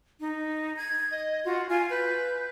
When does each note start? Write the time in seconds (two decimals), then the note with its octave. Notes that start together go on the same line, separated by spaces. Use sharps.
0.20 D#4
0.77 G#6
1.12 D#5
1.45 F4 F#4
1.69 F4 G#5
1.90 B4 G6